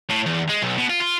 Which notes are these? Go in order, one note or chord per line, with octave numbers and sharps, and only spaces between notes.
A2
E2
G#3
B1
B2
F4
F4